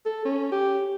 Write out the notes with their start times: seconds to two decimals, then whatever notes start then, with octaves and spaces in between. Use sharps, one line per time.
0.05 A4
0.25 C#4
0.52 G4